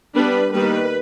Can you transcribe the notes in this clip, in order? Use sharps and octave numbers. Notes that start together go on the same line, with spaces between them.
G3 B3 D4 B4
D#3 G3 A#3 B4